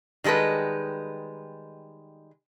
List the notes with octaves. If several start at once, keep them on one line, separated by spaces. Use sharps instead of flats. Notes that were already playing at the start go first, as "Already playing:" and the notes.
D#3 G3 G#3 A4 B4